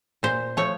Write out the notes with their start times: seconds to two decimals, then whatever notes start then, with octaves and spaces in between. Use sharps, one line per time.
0.23 A#2 C5
0.57 F3 A3 C#5